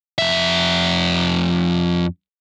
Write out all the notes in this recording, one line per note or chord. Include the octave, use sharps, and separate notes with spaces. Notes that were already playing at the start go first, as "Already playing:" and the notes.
F2 E5